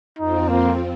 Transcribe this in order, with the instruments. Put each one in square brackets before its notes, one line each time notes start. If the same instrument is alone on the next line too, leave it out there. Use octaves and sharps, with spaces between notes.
[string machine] F2 F3 C4 [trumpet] D#4
[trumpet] A#3